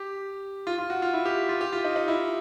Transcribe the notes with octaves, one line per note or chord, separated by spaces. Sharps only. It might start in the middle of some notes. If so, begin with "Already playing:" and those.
Already playing: G4
F4
F4
F#4
F4
E4
G4
F4
G4
F4
D#4
D#4
E4